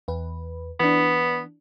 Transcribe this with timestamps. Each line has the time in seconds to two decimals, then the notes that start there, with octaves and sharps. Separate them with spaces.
0.08 E2 B4
0.80 E3 B3 D4